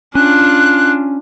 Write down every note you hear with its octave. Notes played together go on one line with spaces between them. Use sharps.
C#4 D4 F4 F#6